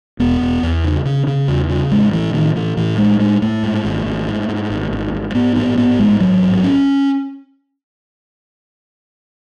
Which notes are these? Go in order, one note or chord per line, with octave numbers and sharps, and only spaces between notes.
E1 B3
E1
E2
C#3
C#3
C#3
E2
C#3
A1 G#3
A2 E3
A2 D#3
A2 E3
A2 E3
A1 G#3
A2 G#3
A2 A3
G#2
G#1
G#1
G#2
G#2
G#1
G#1
G#1
G#2 B3
A1 B3
G#2 B3
A1 G#3
A1 F#3
G#2
C#4